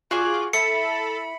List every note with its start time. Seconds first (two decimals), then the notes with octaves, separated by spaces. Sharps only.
0.11 F4 F#4 G#4 D5 D6
0.53 E4 A4 B5 C#7